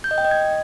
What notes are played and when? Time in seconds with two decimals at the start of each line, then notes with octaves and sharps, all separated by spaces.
0.04 G6
0.11 D#5
0.18 G5
0.25 D#5
0.31 G#6